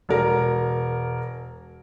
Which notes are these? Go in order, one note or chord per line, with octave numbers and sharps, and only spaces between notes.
E1 A#4